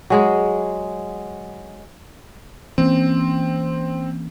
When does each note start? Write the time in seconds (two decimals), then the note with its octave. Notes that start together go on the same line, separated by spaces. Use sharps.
0.10 F#3 G#3 G#4
2.78 E3 A#3 C4 C#4